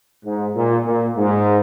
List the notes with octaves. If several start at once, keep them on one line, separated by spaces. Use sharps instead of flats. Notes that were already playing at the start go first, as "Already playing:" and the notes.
G#2
A#2
A#2
G#2